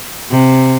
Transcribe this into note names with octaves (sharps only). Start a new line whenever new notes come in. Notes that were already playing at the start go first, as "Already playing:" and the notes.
C3